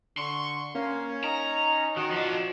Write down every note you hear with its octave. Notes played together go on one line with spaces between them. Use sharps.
D3 C6 C#6
A#3 C#4
D#4 A#5
D#3 F#4
F3 D4